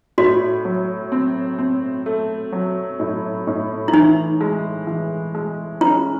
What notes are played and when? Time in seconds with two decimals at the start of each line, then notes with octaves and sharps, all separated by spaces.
0.18 A2 F#4
0.65 F#3
1.12 C4
1.58 C4
2.06 A3
2.52 F#3
3.00 A2
3.47 A2
3.88 E4
3.93 E3 D#4
4.41 G#3
4.87 E3
5.35 G#3
5.81 C#4 E4